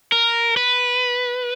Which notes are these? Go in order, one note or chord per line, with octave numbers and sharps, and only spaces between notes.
A#4
B4